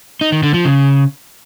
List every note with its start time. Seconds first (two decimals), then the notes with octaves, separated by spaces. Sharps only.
0.21 D#4
0.32 D#3
0.43 D3
0.54 F3
0.65 C#3